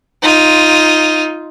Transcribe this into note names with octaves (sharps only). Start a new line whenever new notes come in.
D#4 F4